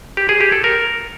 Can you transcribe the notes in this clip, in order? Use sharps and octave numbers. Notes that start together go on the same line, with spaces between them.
G4
G#4
G4
A4
A#4